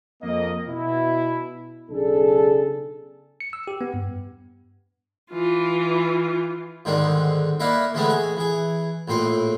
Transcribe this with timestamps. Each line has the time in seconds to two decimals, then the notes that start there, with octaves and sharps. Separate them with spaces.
0.22 F2 A#3 D#5
0.67 B2 E4
1.90 B1 C#3 D4 G#4 A4
3.40 C#7
3.53 E6
3.67 G4
3.81 B3
3.94 G2
5.32 E3 F4
6.85 G#2 D3 D#3 G3 C4
7.60 A#3 E4 B4 D5 D#5 F5
7.94 D3 E3 G#3 A3 B3 C4
8.10 G#4 D#5
8.37 E3 G#4
9.08 A#1 A2 C4 C5